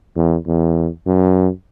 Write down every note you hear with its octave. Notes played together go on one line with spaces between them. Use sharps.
E2
E2
F#2